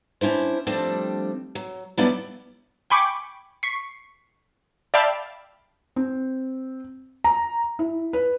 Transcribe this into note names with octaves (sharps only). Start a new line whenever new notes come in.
C#4 D4 E4 C5
F3 G3 A3 C4 D4
F#3
F#3 G3 B3 D4 E4 D5
G5 G#5 B5 C#6 D6
C#6 B6 C7
D5 E5 F5 G5 A5 B5
C4
A#5
E4
B4